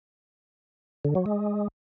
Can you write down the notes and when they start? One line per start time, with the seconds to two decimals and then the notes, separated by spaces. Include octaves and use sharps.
1.05 D3
1.15 F#3
1.26 G#3